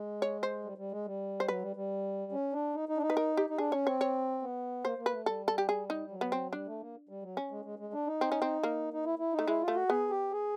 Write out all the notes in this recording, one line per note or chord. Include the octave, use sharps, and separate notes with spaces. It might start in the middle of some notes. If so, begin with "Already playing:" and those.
Already playing: G#3
C#5
C5
G3
G3
G#3
G3
C5
F#3 B4
G3
G3
C#4
D4
D#4
D#4
D4
D#4
B4
A#4
G4
D#4
D4 G#4
C#4 C#5
C4 C#5
C#5
B3
A#3 C5
A#3
B4
A3
G3 A4
A4
G4
G#4
D#4
F#3
B3
C4
G3 D4
A3
A#3
G3
F#3
C#4
G#3
G#3
G#3
D4
D#4
C4
C#4
C4
A#3
D#4
E4
E4
D#4
A3
G#3 E4
F4
A3
F#4
B3 G#4
G4
G#4